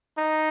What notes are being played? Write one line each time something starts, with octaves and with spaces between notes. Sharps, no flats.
D#4